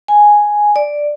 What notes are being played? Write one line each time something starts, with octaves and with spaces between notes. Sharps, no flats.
G#5
D5